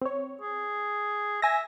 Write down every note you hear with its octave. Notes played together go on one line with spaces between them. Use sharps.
C4 C#5
G#4
E5 G#5 A#6